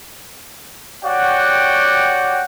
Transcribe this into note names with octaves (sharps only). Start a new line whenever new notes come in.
F#4 G4 C#5 D5 F#5 G5